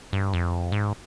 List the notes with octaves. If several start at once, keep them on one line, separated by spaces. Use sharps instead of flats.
G2
F2
G#2